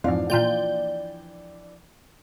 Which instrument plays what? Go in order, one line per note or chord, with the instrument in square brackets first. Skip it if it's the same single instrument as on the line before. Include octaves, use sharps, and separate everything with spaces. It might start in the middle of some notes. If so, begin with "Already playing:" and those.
[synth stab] F2 G#2 [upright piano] E3 F3 D4 [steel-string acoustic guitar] F5
[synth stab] A#2 F4 G6 [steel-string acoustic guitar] D5 G5